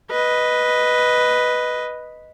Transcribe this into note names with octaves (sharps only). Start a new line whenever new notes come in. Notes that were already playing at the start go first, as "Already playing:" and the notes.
B4 D#5